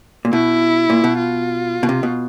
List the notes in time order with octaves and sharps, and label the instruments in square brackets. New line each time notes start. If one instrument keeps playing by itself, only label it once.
[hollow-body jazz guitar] A#2
[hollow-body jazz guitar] B2 [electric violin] E4
[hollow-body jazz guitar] A#2
B2
[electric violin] F4
[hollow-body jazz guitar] B2
C3
B2